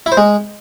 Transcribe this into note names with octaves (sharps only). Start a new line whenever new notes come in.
E4
C5
G#3